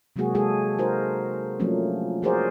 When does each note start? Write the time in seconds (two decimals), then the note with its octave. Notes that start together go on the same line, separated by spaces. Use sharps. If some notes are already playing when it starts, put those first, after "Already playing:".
0.16 C3 F#3 G#3 A#3 F#4 G#4
0.34 G#3 F#4 G#4 A4
0.78 D#4 F#4 A#4 C5
1.60 F3 F#3 A3 A#3 C#4 D4
2.22 F3 F#4 G#4 A#4 C5 D5